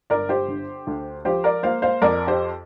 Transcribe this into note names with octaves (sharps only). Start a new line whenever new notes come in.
G1 A#4 D5
G4 C5
D3
D2
F3 G4 C5
A#4 D5
A#3 C5 F5
C5 F5
F2 A#4 D5
G4 C5